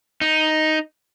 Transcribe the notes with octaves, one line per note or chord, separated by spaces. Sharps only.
D#4